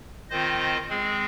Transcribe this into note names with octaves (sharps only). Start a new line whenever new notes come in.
D#3 C4 F4 C5 D#5
G#3 C4 G#4